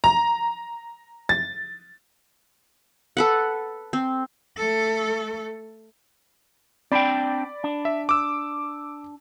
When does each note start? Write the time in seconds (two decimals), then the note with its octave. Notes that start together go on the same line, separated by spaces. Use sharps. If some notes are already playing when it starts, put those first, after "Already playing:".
0.04 A#5
1.29 A6
3.17 A4 B4 F#5
3.93 C4
4.57 A3 A4
6.92 C4 D4 D5 G5 B5
7.64 D4
7.85 E5
8.09 D6 E6